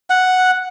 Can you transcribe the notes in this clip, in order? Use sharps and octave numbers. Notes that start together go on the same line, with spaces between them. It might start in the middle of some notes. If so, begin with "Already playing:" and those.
F#5